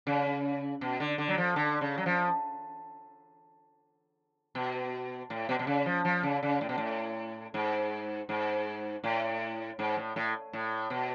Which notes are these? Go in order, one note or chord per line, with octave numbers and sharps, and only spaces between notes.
C#3
B2
D3
D3
F#3
F3
D3
C#3
F#3
F3
B2
A2
B2
B2
C#3
F3
F3
C#3
C#3
A2
B2
A2
G#2
G#2
A2
G#2
A2
A2
A2
B2